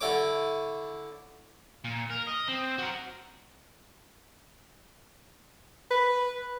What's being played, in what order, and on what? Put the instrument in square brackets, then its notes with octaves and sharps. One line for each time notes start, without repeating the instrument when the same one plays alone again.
[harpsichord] D3 E4 A4 C#5 D6
[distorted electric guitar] A#2
A#4
D#5
C4
F#4 A#4
[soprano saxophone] B4